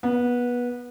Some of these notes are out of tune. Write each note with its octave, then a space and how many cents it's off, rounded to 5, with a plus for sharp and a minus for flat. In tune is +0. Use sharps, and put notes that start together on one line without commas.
B3 -20